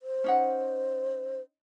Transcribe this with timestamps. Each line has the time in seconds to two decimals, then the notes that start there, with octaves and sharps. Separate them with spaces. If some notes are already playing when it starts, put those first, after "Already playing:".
0.03 C5
0.24 C#4 D#4 F#5